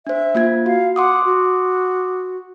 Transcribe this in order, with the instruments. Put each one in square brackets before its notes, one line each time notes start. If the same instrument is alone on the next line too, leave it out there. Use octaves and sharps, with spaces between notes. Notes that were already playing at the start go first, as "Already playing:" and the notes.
[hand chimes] D4 C5 [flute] E5
[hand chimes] A#3 F4 G#6
[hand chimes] F#4 [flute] F5
[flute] F#5 [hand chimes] C6 D6 D#6
[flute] F#4